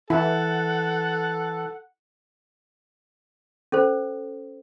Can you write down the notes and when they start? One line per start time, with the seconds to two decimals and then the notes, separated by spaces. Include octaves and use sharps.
0.10 E3 E4 A4 F#5
3.72 C#4 A4 C5